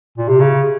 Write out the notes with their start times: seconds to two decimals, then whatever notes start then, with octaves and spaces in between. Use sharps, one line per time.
0.17 A#2
0.29 C3
0.40 C#3